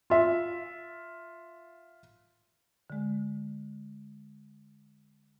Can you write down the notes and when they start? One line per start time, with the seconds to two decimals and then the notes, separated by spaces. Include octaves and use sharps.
0.10 F4 E5
2.90 D3 G#3